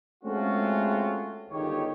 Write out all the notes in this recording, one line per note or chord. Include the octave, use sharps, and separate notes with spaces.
G#3 A3 C4 C#4 F4 F#4
G1 C#2 D#3 D#4 G4 C#5